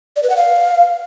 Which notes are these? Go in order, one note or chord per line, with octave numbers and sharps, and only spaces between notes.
D5
B4
F#5
F5